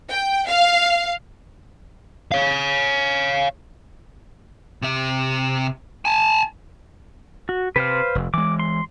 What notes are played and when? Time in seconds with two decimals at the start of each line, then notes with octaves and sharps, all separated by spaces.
0.10 G5
0.48 F5
2.32 C#5 F5
4.82 C3 E5
6.05 G#5 A5
7.49 F#4
7.76 C3 B4 C5 F5
8.15 F1
8.34 E3 G#3 D6
8.59 C6